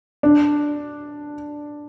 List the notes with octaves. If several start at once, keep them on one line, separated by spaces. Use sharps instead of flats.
D4